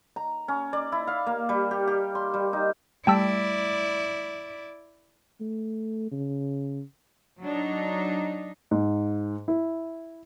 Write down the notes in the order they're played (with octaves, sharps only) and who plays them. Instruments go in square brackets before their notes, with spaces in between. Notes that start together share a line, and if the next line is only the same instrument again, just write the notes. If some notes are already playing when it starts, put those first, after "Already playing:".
[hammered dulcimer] A#5
C#4
D5
E4
F5
A#3
G3
G4
G4
C6
G3
D#4
[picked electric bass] G3 A3 [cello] E4 D5 [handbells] G5 A5 E6
[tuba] A3
C#3
[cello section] F#3 D4 D#4
[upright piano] G#2
E4